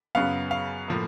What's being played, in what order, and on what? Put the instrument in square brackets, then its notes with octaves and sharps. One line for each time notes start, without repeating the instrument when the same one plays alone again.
[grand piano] F#2 C#3 F#3 B3 F5
F5
A2 F3 A#3